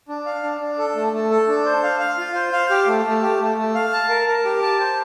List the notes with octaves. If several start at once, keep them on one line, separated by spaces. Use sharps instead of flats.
D4
F5
D4
D4
A4
A3
A3
A4
D4
C5
F5
F5
F4
C5
F5
G4
A3
A3
G4
A3
A3
F5
A5
A#4
A#4
G4
A5
C5